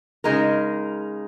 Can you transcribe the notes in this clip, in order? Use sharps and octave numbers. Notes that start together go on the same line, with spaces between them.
C#3 G#3 D#4 A#4